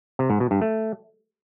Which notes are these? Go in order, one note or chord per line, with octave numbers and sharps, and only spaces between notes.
C3
G#2
B2
G2
A3